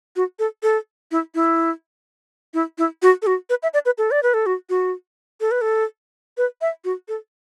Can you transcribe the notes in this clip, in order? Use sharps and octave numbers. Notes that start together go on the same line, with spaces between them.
F#4
A4
A4
E4
E4
E4
E4
F#4
A4
F#4
B4
E5
D5
B4
A4
D5
B4
A4
F#4
F#4
A4
B4
A4
B4
E5
F#4
A4